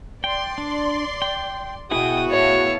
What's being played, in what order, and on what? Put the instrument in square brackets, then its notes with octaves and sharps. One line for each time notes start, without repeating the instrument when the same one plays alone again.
[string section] D5 C6 [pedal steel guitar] G5
[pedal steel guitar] D4
G5
[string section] B2 G5 [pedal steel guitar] B3 E4 G#4 [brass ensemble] F#4 [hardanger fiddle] D#6
[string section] A2 F5 A5 [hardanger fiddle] C#5 E5